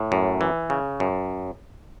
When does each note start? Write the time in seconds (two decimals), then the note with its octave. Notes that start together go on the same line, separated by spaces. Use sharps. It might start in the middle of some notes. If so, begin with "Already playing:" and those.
Already playing: A2
0.12 F#2
0.41 E3
0.70 C#3
1.00 F#2